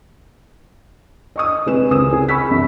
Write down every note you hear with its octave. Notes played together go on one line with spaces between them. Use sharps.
D#5 C#6 D#6
C3 G#3 G#4 B4 E7
C#2 C4 C#4 A#4 D#6 E7
G#4
B5 C#6 E6 B6
C2 F#2